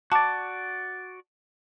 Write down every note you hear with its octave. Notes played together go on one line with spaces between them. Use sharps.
F#4 D5 A5 D6